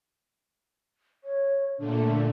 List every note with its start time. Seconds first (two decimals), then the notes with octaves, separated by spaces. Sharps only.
1.24 C#5
1.78 A#2 D3 A3 D4